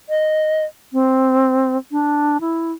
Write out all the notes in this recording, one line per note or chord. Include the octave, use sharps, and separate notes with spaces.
D#5
C4
D4
E4